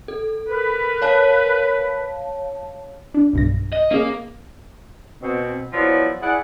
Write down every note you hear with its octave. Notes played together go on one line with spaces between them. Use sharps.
A4
A#4 B4
C#5 F5 A5
D4
B1 G2 A#6
D#5
A#3 C#4 G#4
B2 C4
F3 F#3 B3 E4 D5
E4 G#4 D5 F#5